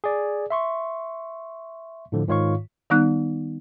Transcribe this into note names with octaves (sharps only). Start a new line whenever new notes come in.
G#4 D5
E5 C6 C#6
A2 D3 F3
G#2 D#3 F4 C#5 F5 C#6
D#3 G3 B3 D#4 F#6